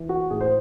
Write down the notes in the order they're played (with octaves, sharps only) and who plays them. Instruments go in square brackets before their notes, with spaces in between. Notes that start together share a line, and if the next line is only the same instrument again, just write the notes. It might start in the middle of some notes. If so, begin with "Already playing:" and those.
Already playing: [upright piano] E3
F#4
A2 G#4
C5